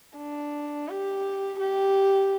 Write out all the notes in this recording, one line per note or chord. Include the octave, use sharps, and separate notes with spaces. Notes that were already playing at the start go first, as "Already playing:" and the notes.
D4
G4
G4